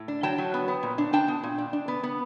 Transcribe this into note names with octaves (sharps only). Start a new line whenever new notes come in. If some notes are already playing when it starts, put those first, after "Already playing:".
Already playing: A2
D4
F#3 G5 A5
F#3
B3
B3
A#2
D4
D4 G5 A5
B3
A#2
D4
D4
B3
B3